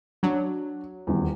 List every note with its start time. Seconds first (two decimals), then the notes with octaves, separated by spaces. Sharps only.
0.23 F#3 D4
1.07 D#1 E2